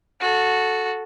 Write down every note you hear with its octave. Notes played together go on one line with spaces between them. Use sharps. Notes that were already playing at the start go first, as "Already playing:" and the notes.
F#4 A4